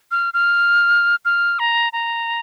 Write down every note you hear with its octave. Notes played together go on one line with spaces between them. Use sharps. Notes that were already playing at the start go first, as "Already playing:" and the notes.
F6
F6
F6
A#5
A#5